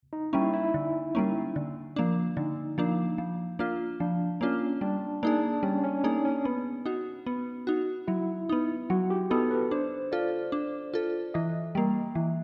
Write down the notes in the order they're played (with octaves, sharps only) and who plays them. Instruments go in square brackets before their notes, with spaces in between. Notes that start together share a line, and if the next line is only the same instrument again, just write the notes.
[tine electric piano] D#4
[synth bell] G3 A#3 C#4 [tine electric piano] E4
[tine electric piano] E4
[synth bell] D3
G3 A#3 C#4
D3
F3 A#3 D4
[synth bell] D3 [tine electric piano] D#4
[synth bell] F3 A#3 D4
F3
A#3 D4 F4
[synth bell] F3 [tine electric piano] D4
[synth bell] A#3 D4 F4 [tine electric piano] C#4
[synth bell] G3 [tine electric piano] D4
[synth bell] A#3 D#4 G#4 [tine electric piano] D4
[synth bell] G3 [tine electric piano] C#4
[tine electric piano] C#4
[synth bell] A#3 D#4 G#4 [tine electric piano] D4
[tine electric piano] C#4
[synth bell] B3
D#4 F#4
B3
D#4 F#4
[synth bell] F#3 [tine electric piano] E4
[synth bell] B3 D#4
[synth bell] F#3 [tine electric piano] F#4
[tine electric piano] G4
[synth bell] B3 D#4 [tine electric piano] A4
[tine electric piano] B4
[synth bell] D4 [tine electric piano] C5
[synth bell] F4 A4 [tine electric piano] D5
[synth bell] D4
F4 A4
[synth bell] E3 [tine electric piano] D#5
[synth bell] G3 A#3
E3